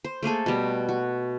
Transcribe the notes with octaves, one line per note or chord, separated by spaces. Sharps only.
C5
A3 A#3 G#4 A4
B2 G3
F#4